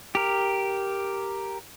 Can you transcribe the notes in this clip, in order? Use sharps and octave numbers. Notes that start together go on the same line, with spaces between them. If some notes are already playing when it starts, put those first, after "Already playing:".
G4 A#4